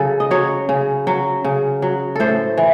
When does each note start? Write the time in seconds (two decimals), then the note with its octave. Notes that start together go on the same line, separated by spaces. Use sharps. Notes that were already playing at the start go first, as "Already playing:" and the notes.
Already playing: C#3 F#3 A4
0.20 D#5
0.31 F#3 C#5
0.69 C#3
1.07 F#3
1.44 C#3
1.82 F#3
2.15 A2 A4 C5
2.57 E3